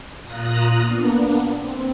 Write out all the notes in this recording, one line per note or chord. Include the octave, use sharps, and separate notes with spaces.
A#2 F4 A#5 D#6 F#6
A#3 B3 D4
C4